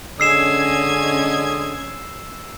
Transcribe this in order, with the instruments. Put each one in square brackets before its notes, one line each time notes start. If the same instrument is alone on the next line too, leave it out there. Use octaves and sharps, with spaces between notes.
[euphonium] D3 [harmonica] G#3 D#5 [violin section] C#4 G#6 [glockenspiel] E6 C7 E7